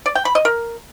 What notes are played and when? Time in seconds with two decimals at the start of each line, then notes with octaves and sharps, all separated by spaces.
0.06 D5
0.15 G5
0.25 B5
0.35 D#5
0.45 A#4